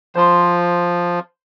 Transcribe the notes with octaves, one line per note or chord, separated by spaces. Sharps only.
F3 C5 C6